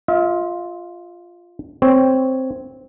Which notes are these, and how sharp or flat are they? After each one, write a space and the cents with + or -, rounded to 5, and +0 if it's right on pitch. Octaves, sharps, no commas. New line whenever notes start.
F4 +0 E5 -45
C4 +0 C#5 +0